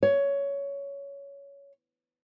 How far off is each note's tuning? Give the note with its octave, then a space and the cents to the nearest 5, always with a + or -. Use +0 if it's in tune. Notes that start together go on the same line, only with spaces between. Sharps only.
C#5 +15